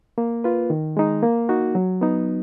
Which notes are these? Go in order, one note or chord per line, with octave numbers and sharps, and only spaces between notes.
A#3
F4 B4
D#3
G#3 D#4
A#3
D#4 F#4
F#3
B3 D#4